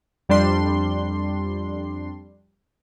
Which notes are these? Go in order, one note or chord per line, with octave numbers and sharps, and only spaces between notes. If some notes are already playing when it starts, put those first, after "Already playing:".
F2 G3 D4 C6